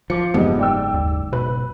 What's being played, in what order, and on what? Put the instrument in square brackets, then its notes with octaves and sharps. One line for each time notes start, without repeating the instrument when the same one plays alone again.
[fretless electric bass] F3 [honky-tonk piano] D6 C#7
[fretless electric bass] F#1 G#2 [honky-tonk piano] F2 G3 D#4 [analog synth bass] B3
[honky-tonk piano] D5 G5 E6
[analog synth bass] D#2
[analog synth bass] B2 [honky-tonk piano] B4